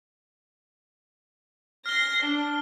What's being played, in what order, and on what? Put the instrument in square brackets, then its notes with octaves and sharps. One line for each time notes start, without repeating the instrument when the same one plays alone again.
[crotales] F6 G7 [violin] A#6 C7
[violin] D4